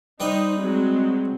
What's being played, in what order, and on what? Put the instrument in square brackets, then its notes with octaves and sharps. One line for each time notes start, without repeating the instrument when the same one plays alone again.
[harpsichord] G3 B4 D#5 [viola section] D#4 C5
[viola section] F#3 G#3 C4